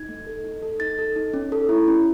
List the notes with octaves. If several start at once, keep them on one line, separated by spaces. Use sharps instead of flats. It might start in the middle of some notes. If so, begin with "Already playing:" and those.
Already playing: D#4 G#6
A3
A4
D#4
A4
D#4 A6
A4
D#4
C#4
A4
E4
C#4